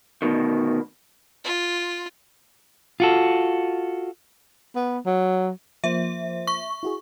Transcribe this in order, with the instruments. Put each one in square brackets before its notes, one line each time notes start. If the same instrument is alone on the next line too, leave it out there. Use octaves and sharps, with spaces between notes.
[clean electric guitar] D2 B2 D#3
[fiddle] F4
[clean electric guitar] F4 F#4 A4
[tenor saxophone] B3
F#3
[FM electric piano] F3 A#3 C5 [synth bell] E5
[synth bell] C#6
[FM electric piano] E4 F#4 G#4